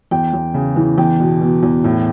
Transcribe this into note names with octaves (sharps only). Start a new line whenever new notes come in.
E2 G5
E2
C#3
E3
E2 G5
B2
B2
E2
A2